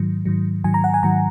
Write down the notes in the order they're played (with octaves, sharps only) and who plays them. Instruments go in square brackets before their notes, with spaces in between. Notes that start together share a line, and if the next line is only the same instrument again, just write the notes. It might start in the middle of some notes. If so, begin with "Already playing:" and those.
Already playing: [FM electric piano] G#2 D#3 F#3
G#2 D#3 F#3
G#2 D#3 F#3 G#5
A#5
F#5
G#5
G#2 D#3 F#3 A#5